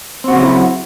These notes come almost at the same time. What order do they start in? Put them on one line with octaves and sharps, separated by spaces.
C4 F#4 C#3 F#3 E4